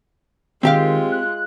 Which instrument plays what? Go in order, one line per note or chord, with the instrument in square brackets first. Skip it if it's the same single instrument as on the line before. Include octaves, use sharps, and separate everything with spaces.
[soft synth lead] D#3 [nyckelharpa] G#3 F4 [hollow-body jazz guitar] C4 G4 F5
[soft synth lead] F#6